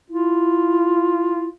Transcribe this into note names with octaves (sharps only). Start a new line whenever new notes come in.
E4 F4